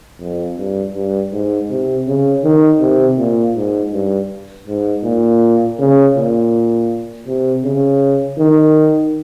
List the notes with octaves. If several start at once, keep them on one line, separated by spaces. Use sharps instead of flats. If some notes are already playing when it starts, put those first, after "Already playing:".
F2
G2
G2
G#2
C3
C#3
D#3
C3
A#2
G#2
G2
G#2
A#2
C#3
A#2
C3
C#3
D#3